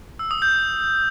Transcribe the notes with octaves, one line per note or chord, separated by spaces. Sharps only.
E6
D#6
G6